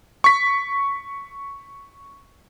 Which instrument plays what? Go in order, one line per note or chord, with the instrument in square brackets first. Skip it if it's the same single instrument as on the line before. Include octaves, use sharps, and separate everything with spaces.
[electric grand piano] C#6 B6